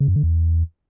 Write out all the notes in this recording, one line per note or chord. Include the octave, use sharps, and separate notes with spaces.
C#3
F#2
D3
E2